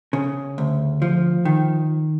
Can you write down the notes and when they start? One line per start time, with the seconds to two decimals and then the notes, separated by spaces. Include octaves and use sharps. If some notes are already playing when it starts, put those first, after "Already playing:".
0.13 C#3
0.58 D2
1.02 F3
1.45 D#3